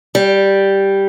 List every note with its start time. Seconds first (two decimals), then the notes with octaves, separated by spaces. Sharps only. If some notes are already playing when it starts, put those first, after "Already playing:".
0.15 G3